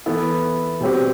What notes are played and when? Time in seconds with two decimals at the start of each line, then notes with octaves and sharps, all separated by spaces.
0.06 E3 B3 E4 A4
0.81 B2 G3 C4 G4